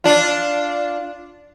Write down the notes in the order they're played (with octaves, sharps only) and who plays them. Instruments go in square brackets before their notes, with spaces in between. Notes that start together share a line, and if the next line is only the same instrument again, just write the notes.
[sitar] D4 F4